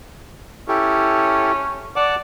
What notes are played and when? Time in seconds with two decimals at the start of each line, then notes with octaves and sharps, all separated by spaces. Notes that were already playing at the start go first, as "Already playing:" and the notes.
0.68 C#4 E4 G4 A4
1.96 D5 F#5 A5 D6